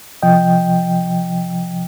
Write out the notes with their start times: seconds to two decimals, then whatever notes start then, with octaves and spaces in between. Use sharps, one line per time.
0.22 C3 F3 D#5 G5